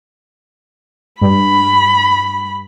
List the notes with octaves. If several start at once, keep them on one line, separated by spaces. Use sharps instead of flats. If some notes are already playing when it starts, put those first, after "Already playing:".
G2 B5